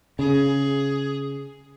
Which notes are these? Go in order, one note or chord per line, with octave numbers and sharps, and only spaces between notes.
C#3 G#4